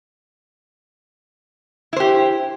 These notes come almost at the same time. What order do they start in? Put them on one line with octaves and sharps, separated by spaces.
E4 C5 G4